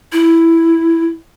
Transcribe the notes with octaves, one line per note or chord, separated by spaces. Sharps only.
E4